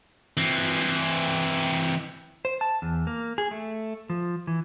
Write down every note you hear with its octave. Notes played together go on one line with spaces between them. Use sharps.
E3 C4
C5
A5
E2
A#3
G#4
A3
F3
E3